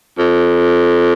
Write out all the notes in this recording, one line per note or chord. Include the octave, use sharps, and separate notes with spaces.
F2